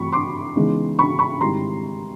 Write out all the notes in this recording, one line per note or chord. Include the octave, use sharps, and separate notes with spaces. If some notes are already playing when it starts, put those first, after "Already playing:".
Already playing: G2 E3 A3 C4 B5 C#6
C6 D6
C#3 E3 G#3 B3 D#4
B5 C#6
B5 C#6
G#2 D#3 G3 C4 E4 A#5 C6